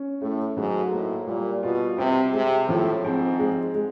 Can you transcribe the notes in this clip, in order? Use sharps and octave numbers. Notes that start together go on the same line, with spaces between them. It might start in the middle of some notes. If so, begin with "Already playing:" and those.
Already playing: C#4
A2 A3
G#2 F#3
A2 A#3
A#2 G3
B2 F4
C3 C4
C3 G#3
A2 F3
G#2 C4
G#3
G#3